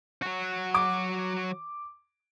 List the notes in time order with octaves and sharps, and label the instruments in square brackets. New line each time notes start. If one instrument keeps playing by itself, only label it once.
[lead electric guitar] F#3 F#4
[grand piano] D6